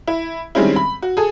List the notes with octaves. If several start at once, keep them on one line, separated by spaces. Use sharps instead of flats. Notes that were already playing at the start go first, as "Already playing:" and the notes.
E4
D#3 G3 G#3 C4 C#4 E4
B5
F#4
G#4 A4